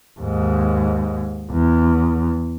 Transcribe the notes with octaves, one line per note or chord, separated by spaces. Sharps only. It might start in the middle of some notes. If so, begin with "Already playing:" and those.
D#2 G#2
E2